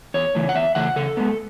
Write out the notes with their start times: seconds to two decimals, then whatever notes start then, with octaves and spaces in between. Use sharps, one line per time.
0.14 E2 C#5
0.35 C#3 E3 A3
0.49 F#5
0.55 E2 E5
0.75 C#3 E3 A3 F#5
0.96 C#3 A4
1.17 G#3 B3